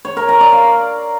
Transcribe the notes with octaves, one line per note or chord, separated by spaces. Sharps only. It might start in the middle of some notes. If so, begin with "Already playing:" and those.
C#5
A#4
A#5
D5
F5